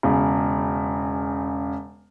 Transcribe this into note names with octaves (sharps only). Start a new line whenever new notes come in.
E1 C#3